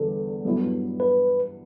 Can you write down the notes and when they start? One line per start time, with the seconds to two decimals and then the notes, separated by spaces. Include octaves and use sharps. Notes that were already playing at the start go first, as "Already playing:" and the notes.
Already playing: E2 D3 G3 A4
0.45 G2 F#3 B3 E4
1.00 B4